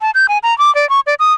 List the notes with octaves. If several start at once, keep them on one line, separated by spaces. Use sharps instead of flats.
A5
G6
G#5
A#5
D6
D5
C#6
D5
D#6